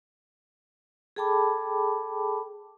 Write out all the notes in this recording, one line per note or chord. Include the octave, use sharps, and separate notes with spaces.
G#4 A4 G5 A5 B5 D6